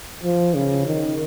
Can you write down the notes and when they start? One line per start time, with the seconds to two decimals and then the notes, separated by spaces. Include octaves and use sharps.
0.24 F3
0.55 C#3
0.87 D#3